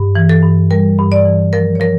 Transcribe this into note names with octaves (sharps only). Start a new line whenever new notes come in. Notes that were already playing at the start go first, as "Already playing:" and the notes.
Already playing: G2
E3
A4
G2
G3 A#4
G2
D5
E3
F3 A#4
C#5
F3 A#4